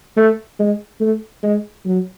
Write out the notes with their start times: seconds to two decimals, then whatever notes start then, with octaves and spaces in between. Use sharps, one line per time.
0.16 A3
0.59 G#3
1.00 A3
1.43 G#3
1.85 F#3